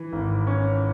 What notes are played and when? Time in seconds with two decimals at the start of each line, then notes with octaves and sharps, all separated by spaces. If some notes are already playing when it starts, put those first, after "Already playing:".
Already playing: E3
0.12 G#1
0.47 C#4